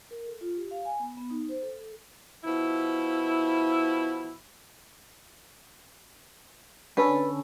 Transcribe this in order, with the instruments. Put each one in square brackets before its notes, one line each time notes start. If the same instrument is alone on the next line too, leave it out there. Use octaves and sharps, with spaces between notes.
[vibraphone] A#4
A4
F4
G4
F5
G#5
B3
B3
D#4
C5
A4
A4
[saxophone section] B2 F3 E4
[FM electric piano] D3 C#4 A4 [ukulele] B4